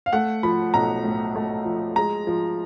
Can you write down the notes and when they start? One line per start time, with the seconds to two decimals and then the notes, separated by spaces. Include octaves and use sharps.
0.06 F5
0.13 A3 F#5
0.43 F3 B5
0.74 B1 A#5
1.04 A2
1.36 A3
1.65 F3
1.96 G#3 A#5
2.27 F3